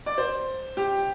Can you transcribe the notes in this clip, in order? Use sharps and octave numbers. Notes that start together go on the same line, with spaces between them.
D5
C5
G4